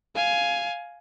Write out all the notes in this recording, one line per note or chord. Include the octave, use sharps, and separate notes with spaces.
F5 G#5